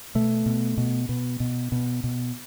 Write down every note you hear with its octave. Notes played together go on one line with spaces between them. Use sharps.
B2 A3
B2
B2
B2
B2
B2
B2